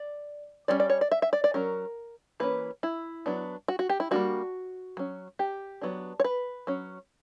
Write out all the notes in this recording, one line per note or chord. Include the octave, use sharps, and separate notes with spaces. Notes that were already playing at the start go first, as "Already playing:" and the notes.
Already playing: D5
G3 A#3 C#4 D5
D5
C#5
D5
E5
E5
D5
D5
F#3 C#4 A#4
E3 A#3 C#4 B4
E4
F#3 B3 D4
F#4
F#4
G4
E4
G3 A#3 D4 F#4
F#3 C#4
G4
F#3 B3 D4
C#5
B4
F#3 C#4